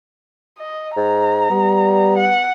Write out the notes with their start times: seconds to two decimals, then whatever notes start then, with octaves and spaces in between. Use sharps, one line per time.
0.59 D#5
0.96 G#2 A#5
1.50 G3 B3
2.18 F#5